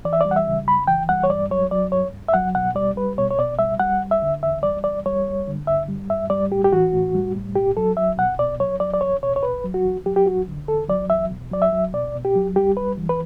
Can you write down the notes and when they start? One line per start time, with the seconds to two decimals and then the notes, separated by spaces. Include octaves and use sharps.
0.05 E3 D5
0.13 E5
0.21 G3 D5
0.31 F#5
0.36 E5
0.47 C#3
0.67 F#2 B5
0.87 E3 G5
1.09 G3 F#5
1.24 C#5
1.30 G2 D5
1.50 F#3 C#5
1.71 F#3 D5
1.92 G2 C#5
2.13 G2
2.29 E5
2.34 F#3 F#5
2.55 B2 F#5
2.75 G3 D5
2.96 G3 B4
3.18 B2 C#5
3.31 C#5
3.38 B2 D5
3.59 G3 E5
3.80 G3 F#5
4.01 E2
4.11 E5
4.22 D3
4.43 E2 E5
4.63 G3 D5
4.84 E2 D5
5.06 G3 C#5
5.26 G2
5.48 D3
5.67 G2 E5
5.88 G3
6.09 G2 E5
6.30 G3 D5
6.51 A2 G4
6.65 G4
6.72 E3 F#4
6.93 A2
7.14 G3
7.35 A2
7.55 B2 G4
7.77 F#3 A4
7.97 F#3 E5
8.18 B2 F#5
8.39 B2 D5
8.60 F#3 C#5
8.80 F#3 D5
8.93 D5
9.01 E2 C#5
9.23 B2 C#5
9.36 C#5
9.43 E2 B4
9.64 F#3
9.74 F#4
9.85 E2
10.06 F#3 G4
10.16 G4
10.26 E2 F#4
10.48 D3
10.68 E2 A4
10.89 F#3 D5
11.10 E2 E5
11.31 B2
11.51 F#3 D5
11.62 E5
11.72 F#3
11.94 B2 D5
12.15 B2
12.25 G4
12.36 F#3
12.56 G3 G4
12.76 F#2 B4
12.97 E3
13.09 B4